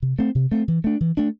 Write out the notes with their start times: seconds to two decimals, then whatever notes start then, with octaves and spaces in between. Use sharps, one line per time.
0.02 C3
0.19 A3 C4
0.35 C3
0.52 A3 C4
0.68 E3
0.84 A3 D4
1.01 E3
1.17 A3 D4